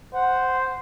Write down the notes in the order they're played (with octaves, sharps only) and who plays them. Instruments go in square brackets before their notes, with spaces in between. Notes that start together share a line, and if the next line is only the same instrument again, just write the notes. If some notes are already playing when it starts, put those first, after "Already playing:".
[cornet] C5 [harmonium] F#5